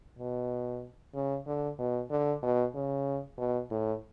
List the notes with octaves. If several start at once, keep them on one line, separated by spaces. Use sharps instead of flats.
B2
C#3
D3
B2
D3
B2
C#3
B2
A2